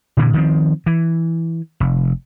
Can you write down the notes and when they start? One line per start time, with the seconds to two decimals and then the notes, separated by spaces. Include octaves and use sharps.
0.17 A#2 D3 E3
0.33 D#3 F3 A3 C4
0.86 E3
1.80 F1